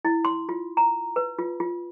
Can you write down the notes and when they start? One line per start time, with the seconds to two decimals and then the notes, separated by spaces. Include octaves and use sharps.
0.05 E4
0.25 C6
0.49 F4
0.77 A#5
1.16 B4
1.39 F4
1.60 F4